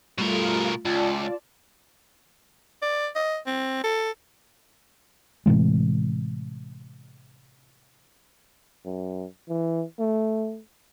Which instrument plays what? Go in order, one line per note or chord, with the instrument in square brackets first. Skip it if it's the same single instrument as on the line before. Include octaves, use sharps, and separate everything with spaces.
[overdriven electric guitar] B2 A#4 [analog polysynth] G3 A3 F4
[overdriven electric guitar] C#2 [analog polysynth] F4 D5 A5
[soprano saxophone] D5
D#5
C4
A4
[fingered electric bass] A2 C3 E3 G#3
[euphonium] F#2
E3
A3